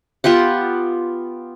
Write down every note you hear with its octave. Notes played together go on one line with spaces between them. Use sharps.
B3 F4 G4 F#5